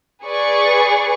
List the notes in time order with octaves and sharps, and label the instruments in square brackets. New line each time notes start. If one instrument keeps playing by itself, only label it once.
[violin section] G#4 B4 D5 C#6